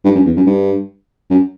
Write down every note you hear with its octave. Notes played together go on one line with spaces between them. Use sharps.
G2
F#2
E2
F#2
G2
F#2